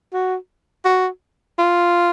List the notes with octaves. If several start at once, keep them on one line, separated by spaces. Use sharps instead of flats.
F#4
F#4
F4